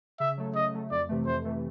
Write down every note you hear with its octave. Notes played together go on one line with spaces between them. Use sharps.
C#3 E5
F#3 A3
C#3 D#5
F#3 A3
F2 D5
C3 E3 A3
F2 C5
C3 E3 A3